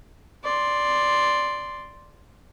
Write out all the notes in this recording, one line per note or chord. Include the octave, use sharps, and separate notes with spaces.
D5 C6